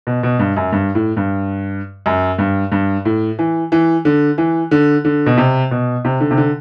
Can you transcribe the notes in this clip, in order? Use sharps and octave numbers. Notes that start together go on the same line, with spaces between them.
B2
B2
G2
F#2
G2
A2
G2
F#2
G2
G2
A2
E3
E3
D3
E3
D3
D3
B2
C3
B2
C3
D3
C3
D3